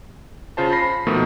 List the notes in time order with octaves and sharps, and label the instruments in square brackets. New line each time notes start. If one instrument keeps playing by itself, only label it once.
[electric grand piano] C#3 F4 C5 A5
B5 A#6 C7
B2 D#3 F3 A3 A#3